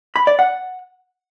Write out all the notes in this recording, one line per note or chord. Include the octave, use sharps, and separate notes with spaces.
B5
D5
F#5